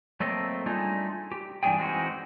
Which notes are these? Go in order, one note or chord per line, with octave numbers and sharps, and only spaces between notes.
F#3 A3 A#3 C4 A4 D#5
G3 A3 D4 D#4 F4 G#4
G4
G2 E3 B3 D4 G#4 G5
E3 G#3 C4 D#4 F4 F#4